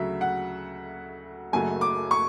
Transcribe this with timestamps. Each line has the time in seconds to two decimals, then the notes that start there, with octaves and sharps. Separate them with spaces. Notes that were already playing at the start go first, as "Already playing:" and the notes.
Already playing: D2 C#3 F#3 E5
0.21 F#5
1.52 F#1 F#2 C#3 F#3 A3 G#5
1.81 D6
2.11 C#6